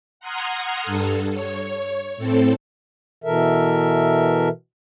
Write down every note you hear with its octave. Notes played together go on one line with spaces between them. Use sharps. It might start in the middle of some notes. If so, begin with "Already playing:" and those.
F#5 A#5 C6 D#6 F6 G#6
G2 A4
C#5
A2 C4 A4
B2 E3 A4 A#4 E5